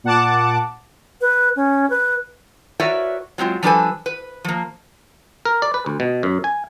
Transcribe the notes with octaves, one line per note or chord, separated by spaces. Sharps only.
A#2 F#5 A5 D6
B4
C#4
B4
F#4 A#4 B4 C#5 D5 E5
F#3 G#3 C4 F4
F3 G3 D4 A4 B4 G#5
B4
F3 A#3
A#4
D5
B4
D2
B2
F#2
G#5